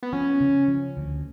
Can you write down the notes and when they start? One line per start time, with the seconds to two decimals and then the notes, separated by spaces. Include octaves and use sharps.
0.03 B3
0.13 F3 C#4
0.41 C#3
0.68 F3
0.97 D2